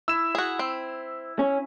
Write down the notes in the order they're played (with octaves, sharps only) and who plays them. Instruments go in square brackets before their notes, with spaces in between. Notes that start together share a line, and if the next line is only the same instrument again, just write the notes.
[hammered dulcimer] E4 [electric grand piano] E6 E7
[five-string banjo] F#4 G#4
C4
[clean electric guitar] C#4